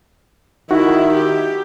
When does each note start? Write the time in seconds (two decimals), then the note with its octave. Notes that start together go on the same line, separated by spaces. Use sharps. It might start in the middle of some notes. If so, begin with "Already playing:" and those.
0.71 D#3 D#4 E4 F#4 E5
1.14 G4